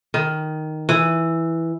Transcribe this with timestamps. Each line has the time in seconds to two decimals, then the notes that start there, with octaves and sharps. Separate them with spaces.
0.14 D#3
0.89 E3